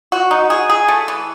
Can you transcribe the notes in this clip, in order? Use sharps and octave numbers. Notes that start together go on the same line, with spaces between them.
F#4
D#4
G#4
G#4
A3
E3